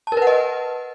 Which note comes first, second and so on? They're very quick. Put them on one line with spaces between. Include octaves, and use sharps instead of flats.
A5 A#4 B4 F#5 D#5